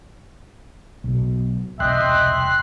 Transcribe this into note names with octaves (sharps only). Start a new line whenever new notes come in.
B1 B2
E1 C2 D#5 E5 G5 C6 F#6